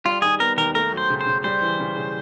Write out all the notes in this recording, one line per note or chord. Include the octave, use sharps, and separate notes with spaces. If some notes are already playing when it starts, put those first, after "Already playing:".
G3 F4
D#3 G#4
B3 A#4
D#2 A#4
A3 A#4
F#3
C5
C#3
C5
C#3
G3 C5
E3
C#3
C#3